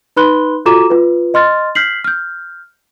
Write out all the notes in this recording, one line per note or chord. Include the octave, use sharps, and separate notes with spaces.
D#4 B4 B5 C6 F#6 G7
F4 F#4 A4 A#5 D6 E7
F4 B4
D#5 C6 F6 A6
F6 G6 B6 C7 F#7
F6 G6